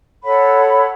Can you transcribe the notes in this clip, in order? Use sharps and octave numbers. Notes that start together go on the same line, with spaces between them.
A4 C#5 F#5 B5